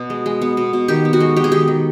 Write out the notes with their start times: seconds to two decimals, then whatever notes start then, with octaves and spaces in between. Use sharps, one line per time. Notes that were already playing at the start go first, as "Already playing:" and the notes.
Already playing: B2 B3
0.10 G#3
0.26 G#3
0.42 B3
0.57 B2
0.73 B2
0.88 D#3 G4
1.05 B3
1.13 F#4
1.20 G#3
1.37 G#3 G4
1.44 G#4
1.52 D#3 G4
1.68 D#3